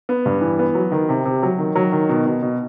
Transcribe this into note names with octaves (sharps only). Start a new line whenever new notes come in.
B3
G2
E3
B3
F#3
D#3
C3
C3
F#3
D#3
F#3
D#3
B2
B2
B2